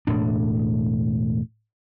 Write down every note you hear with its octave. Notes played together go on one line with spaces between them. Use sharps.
E1 A2 D4